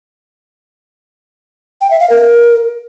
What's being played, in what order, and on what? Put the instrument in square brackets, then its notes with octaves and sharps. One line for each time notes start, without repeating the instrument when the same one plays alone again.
[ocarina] G5
E5
F5
A#4